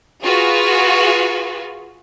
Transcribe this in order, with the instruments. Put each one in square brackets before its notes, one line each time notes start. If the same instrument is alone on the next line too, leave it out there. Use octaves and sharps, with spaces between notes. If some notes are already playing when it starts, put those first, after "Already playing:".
[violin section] F4 F#4 G#4 B4